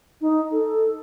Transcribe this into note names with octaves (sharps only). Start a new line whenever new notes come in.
D#4
A4